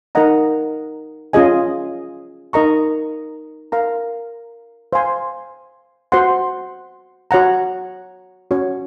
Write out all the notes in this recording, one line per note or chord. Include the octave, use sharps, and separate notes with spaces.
D#4 A#4 D#5 F#5 A#5
C#4 F4 G#4 D#5 G#5
D#4 A#4 D#5 A#5 C#6
A#4 F5 A#5
C5 F5 G#5 C6
F#4 C5 F#5 C6
F#4 C#5 F#5 A#5
C#4 F#4 C#5